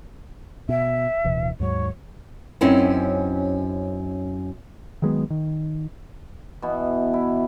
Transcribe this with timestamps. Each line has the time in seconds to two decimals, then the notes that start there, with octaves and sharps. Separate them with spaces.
0.69 B2 E5
1.24 D1 B2 E3
1.60 D#2 G#2 F#3 C#5
2.61 F#2 C4 C#4 D#4 E4
5.02 D#3 F#3 G#3 B3
5.30 D#3
6.62 B2 E3 B3
7.14 E4